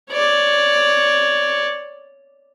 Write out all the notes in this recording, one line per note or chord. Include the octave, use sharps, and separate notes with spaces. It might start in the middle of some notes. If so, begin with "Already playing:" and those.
C#5 D5